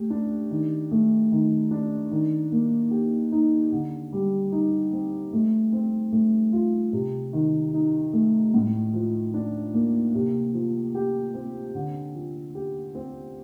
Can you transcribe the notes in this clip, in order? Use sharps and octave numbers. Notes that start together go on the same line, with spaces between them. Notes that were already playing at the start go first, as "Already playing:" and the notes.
Already playing: A3 G4
D4
D#3
A3
D#3
D4
D#3
A#3
G4
D#4
D3
G3
D#4
C4
A3
C4
A3
F4
C3
D#3
D#4
A3
A2
F3
D4
A#3
C3
F3
G4
C4
D3
F3
G4
C4